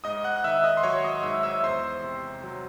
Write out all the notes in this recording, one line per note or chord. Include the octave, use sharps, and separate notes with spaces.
G#2 D#5 D#6
F#5 F#6
F#6
D#3 E5 E6
D#5 D#6
C6
F#3 C#5 C#6
D#5 D#6
G#2 E5 E6
E5 E6
E2 C5 C6
C3
F#3